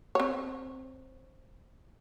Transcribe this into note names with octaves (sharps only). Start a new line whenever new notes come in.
C4 C#5